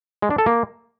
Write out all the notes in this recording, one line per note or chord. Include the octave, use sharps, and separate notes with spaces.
G#3
D4
A4
A#3